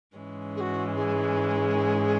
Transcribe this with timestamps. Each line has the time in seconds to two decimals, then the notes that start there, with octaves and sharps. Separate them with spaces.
0.16 G#2 E3 G#3 C#4
0.56 G#4
0.60 F#4
0.96 G#4